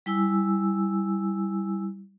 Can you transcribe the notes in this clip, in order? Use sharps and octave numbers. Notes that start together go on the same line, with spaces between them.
G3 E4 G#5 E6